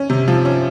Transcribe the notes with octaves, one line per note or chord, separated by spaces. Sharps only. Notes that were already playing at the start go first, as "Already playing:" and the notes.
Already playing: C#4
C3
F3
C#4